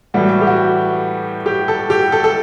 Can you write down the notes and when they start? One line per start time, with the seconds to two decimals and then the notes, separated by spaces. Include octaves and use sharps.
0.14 A2 E3 G3 F#4
0.41 G4
0.47 F#4
1.46 G4
1.68 A4
1.90 G4
2.12 A4
2.24 A4